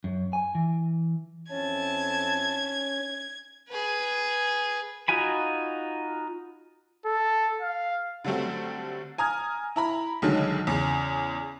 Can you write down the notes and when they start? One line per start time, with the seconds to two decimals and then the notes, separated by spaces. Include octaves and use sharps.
0.04 F#2
0.33 G#5
0.55 E3
1.51 F2 C#4 E4 A5 G#6
3.69 G#4 B4
5.08 D#4 F4 F#4 G#5 B5
7.06 A4
7.62 F5
8.25 D3 F#3 G3 A3 C4
9.18 G#5 A#5 D#6 F6 G#6
9.76 E4 A#5 B5
10.22 B1 D3 D#3 F#3 G#3
10.67 E2 C#3